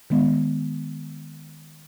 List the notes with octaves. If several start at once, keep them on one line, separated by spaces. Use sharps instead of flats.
D#3 G#3 B3